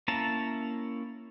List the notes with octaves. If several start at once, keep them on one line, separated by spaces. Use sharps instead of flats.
A#3 C#4 E4 A5 A#5